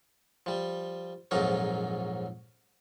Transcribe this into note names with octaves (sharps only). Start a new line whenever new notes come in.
F3 G3
A#1 F2 G#2 F#3 D#4 A#4